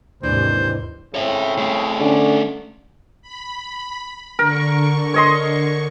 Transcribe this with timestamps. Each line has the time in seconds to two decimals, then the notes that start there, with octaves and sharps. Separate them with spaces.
0.23 D#2 G#2 C3 E3 D4 C5
1.15 A2 C#3 C4 C#5 E5
1.58 A3 G#4
2.01 D3 C#4
3.22 B5
4.39 D3 A#4 C#6
5.14 C#5 D#5 C6